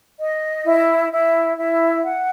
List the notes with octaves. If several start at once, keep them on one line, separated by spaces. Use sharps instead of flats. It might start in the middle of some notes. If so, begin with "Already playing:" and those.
D#5
E4
E4
E4
F#5